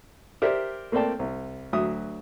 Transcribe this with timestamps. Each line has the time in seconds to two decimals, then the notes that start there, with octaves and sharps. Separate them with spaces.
0.42 G4 A#4 C5 D5 E5
0.92 A3 A#3 C4 D5 G5 A5
1.19 C2
1.73 D2 F#3 E5 D#6